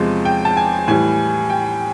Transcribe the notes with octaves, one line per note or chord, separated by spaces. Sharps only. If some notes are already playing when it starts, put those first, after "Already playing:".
Already playing: E2 C3 F3 G#3
G5
A5
G#5
A2 E3 G3 G#5
G5